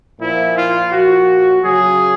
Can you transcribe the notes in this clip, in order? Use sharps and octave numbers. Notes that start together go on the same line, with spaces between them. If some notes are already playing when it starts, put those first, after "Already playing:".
A#2 F3 E4
F4
A#2 F3 F#4
C#3 F#3 G#4